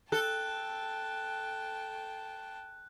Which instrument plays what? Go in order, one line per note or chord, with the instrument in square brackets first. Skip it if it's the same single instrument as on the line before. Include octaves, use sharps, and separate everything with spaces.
[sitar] A4 [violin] G5 A5 [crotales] F#6